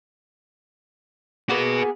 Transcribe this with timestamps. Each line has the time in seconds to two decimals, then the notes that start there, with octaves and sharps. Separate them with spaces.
1.49 A#3 B3 F#4 G#4 B4